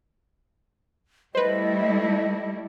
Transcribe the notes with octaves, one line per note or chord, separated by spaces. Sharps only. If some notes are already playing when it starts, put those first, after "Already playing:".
G3 A3 E4 B4 C5 D#5